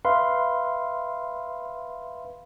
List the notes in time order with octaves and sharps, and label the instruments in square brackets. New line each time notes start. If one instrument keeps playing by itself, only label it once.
[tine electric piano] B4 E5 F5 B5 C6